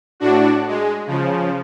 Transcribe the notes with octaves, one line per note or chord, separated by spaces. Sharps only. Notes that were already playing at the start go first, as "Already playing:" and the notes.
A2 D4 F#4
G#3
C#3 F3